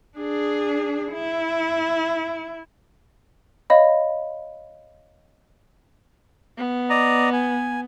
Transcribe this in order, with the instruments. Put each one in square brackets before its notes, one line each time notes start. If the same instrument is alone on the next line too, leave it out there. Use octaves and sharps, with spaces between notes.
[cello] D4 G#4
E4
[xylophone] C#5 D#5 F5 B5
[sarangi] B3
[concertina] D5 D#5 A#5
G#5